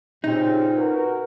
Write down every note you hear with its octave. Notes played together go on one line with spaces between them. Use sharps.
A#2 C#3 C4 D#4 G4
F#4 A#4 B4